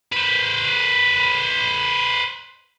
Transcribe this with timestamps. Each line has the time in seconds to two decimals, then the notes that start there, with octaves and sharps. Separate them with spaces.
0.12 B4 C5